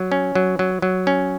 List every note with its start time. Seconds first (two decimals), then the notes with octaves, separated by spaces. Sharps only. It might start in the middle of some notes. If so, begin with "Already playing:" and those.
Already playing: F#3
0.12 C#4
0.35 F#3
0.59 F#3
0.82 F#3
1.07 C#4